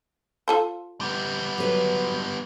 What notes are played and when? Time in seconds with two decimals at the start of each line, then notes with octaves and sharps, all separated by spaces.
0.48 F4 A4 C5
1.01 G3 B3
1.58 F#3 B4